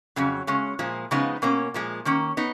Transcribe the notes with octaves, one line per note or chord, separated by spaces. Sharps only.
F2 C#3 F#3
C#3 G#3 C#4
A#2 F3 G#3
C#3 F3 G#3 B3 D#4
B2 A#3 C#4
A#2 F3 G#3
D#3 A#3 C#4
B3 D#4